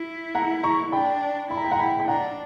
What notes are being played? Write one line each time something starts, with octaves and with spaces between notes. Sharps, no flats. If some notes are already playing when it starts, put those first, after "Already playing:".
Already playing: E4
F#5 A#5
A#5 C#6
D4 G5 B5
E4 B5
A#5
G5
F#5 A#5
G5 B5
G5
D4 F#5 A#5